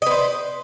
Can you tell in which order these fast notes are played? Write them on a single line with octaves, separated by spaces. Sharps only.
D#5 B4 C5